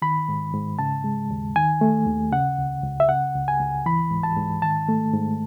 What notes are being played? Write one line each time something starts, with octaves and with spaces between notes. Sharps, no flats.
D#3 B5
G#2
G#2
C#3 A5
G#3
D#2
D#3 G#5
A3
D#2
C#3 F#5
C#2
C#2
E5
C#3 F#5
C#2
G#5
C#2
E3 B5
G#2
A5
G#2
D#3 A5
A3
G#2